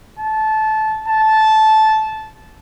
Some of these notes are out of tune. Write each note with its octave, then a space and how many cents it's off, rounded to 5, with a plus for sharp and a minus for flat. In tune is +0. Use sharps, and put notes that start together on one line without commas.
A5 -20
A5 -15